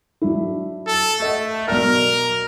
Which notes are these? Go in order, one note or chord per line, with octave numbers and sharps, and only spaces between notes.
F#3 D4 E4
A4
A3 A4 D#5 F#5
B1 A#4 D5 F6